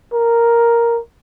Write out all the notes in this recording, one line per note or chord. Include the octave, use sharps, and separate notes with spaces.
A#4